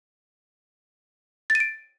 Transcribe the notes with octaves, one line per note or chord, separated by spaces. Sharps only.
A6
D#7
D7